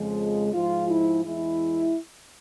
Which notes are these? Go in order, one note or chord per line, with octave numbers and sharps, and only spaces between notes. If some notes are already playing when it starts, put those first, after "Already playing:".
Already playing: F2 C#3 F3 G#3
G#2 F3 G#3 F4
E4
E2 E3 G#3 E4